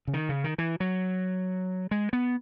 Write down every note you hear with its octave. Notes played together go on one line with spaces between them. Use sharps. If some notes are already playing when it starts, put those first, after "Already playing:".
C#3
D#3
C#3
D#3
E3
F#3
G#3
B3